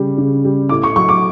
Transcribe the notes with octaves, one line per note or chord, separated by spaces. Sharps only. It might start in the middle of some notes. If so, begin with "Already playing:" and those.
Already playing: C#3 G3
C#3
G3
A2 D6
C#6
F#3 C#6
D6